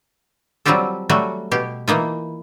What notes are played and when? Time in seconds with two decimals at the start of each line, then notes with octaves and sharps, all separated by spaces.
0.65 F#3 G3 C4 F4 G4 A4
1.09 F#3 G3 A3 F#4
1.51 B2 G4
1.88 E3 A#3 D#4 F4